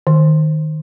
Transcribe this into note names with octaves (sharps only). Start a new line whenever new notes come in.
D#3